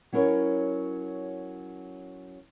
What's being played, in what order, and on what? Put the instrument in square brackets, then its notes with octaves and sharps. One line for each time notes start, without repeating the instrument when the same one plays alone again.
[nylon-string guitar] F#3 C#4 E4 A#4 C#5